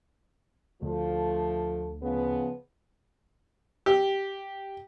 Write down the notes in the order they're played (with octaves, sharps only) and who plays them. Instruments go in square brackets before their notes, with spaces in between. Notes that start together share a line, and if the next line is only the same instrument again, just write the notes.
[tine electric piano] D2 [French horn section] F3 A3
[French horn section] C#3 F3 B3
[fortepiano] G4